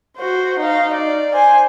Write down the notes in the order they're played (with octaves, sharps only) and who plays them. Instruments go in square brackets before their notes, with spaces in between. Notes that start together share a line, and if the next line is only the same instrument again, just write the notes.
[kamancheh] F#4 C5
D#4 F5
D5
C5 G#5